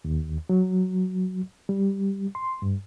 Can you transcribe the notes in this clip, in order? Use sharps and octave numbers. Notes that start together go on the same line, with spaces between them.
D#2
F#3
G3
C6
G2